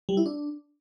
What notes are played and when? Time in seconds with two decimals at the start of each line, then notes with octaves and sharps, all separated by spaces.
0.09 G3
0.17 E4
0.26 D4